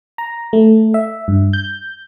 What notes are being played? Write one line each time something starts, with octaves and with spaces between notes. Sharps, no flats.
A#5
A3
E5
G2
G6